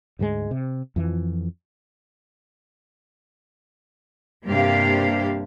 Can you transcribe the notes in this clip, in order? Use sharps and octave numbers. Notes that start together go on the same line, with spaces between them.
D2 G#2 G3 G#3
C3
F2 E3 F3
G2 C3 A#3 D4 G4 F5